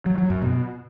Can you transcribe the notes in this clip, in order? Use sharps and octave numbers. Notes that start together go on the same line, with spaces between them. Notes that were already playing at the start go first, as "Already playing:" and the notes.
F#3
F#3
F#2
B2